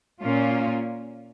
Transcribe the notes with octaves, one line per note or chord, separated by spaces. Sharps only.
A#2 A#3 C#4 F4